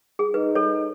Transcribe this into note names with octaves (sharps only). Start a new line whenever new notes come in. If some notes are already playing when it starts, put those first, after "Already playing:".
G#4
D#4 B4
A4 C#5